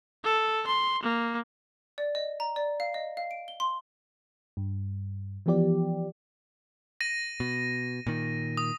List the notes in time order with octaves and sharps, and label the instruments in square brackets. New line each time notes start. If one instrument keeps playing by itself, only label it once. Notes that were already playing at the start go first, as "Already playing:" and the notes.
[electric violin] A4
C6
A#3
[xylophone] D5
D#5
A#5
D5
F5
D#5
F5
D7
G7
C6
[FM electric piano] G2
E3 F3 B3 G4 D5
[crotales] A#6 D#7
[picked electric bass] B2
A#2 D#3
[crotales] D#6